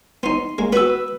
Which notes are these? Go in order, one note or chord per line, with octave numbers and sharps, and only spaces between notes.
B3 D#4 C6
G#3 A#3
B3 F#4 B4 E6